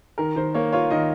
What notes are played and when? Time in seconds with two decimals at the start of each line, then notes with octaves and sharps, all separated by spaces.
0.18 D#3 A#4
0.36 D#3 C5
0.54 A#3 C#5
0.72 F4 C#5
0.90 D#3 D#5